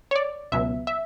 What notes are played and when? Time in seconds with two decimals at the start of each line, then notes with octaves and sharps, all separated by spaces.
0.11 C#5
0.16 D5
0.52 C#2 B2 F#3 E5
0.87 E5